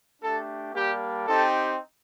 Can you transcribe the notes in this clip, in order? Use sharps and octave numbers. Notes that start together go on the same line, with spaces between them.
A3 D4 G4 A4
G3 A#3 D4 G4
C4 D#4 G4 A4